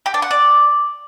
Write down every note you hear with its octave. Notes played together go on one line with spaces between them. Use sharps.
G4
D4
F#5
D5